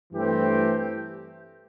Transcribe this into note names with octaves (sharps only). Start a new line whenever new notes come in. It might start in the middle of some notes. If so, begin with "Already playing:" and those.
G2 E3 A3 C4 G4